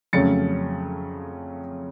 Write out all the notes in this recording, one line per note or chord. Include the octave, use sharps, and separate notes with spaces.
F2 C#3 F#3 A3 C#4 A6 C#7